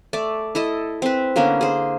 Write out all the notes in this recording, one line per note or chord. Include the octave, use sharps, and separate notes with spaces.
A3 D5
E4 A4 D#5
C4 B4
D3 A#3 B3 C#4
G#4 C5